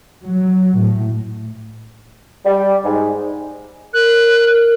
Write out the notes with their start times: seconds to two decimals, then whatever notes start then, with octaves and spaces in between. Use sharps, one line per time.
0.24 F#3
0.77 A2
2.46 G3
2.84 G#2
3.94 A#4 F#6